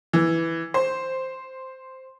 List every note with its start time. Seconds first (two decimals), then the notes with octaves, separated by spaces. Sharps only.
0.13 E3
0.74 C5